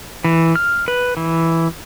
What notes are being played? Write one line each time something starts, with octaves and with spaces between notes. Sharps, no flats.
E3
F6
B4
E3